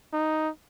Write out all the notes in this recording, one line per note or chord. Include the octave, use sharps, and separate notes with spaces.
D#4